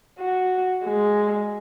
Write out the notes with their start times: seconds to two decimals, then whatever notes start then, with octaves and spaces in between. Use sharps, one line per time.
0.19 F#4
0.85 G#3